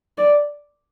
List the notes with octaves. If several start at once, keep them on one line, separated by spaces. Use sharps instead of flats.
D5